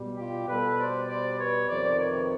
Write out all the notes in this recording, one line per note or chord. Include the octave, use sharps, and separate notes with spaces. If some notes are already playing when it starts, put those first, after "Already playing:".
Already playing: B2 G3
F4 G4
B2 G3 A4 B4
C5 D5
C5 D5
B4 C#5
F2 C3 D#3 C5 D5
B4 C#5